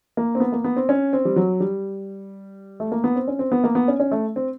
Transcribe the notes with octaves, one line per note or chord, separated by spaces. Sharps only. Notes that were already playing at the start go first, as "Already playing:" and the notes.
A#3
C4
B3
A#3
B3
C4
C#4
C4
G3
F#3
G3
A3
A#3
B3
C4
C#4
C4
B3
A#3
B3
C#4
C#4
A3
C4